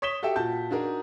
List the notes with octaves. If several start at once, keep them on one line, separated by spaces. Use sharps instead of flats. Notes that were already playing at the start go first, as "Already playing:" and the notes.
C#5 D#6 B6 E7 G7
F#4 G4 A4 E5 G5
A#2 F#4 A5 G6
D4 D#4 F#4 G#4 A#4